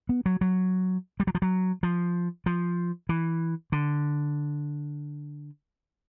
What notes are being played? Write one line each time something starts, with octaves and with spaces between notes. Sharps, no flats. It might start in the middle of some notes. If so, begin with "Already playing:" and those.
B3
F#3
F#3
G3
F#3
F3
F#3
F3
F3
E3
D3